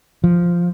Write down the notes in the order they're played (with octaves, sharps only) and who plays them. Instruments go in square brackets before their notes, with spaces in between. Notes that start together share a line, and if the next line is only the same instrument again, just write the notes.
[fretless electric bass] F3